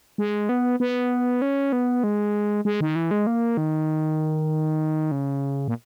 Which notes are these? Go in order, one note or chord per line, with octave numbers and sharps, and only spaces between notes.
G#3
B3
B3
C#4
B3
G#3
G#3
D#3
E3
G#3
A#3
D#3
C#3
A#2